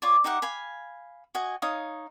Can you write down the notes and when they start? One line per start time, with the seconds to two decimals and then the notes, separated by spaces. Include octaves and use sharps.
0.02 F4 C#5 D5
0.24 D#4 G4 E5 F#5
0.42 F5 G#5 B5
1.35 F#4 D#5 G#5
1.62 D#4 C#5 F5 D#6